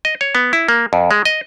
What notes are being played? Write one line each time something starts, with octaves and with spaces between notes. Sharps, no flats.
D#5
C#5
B3
E4
A#3
F2
G#3
D#5